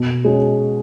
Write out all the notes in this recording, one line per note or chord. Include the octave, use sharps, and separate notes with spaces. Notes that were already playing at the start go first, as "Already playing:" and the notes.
Already playing: B2
G#3 C#4 F#4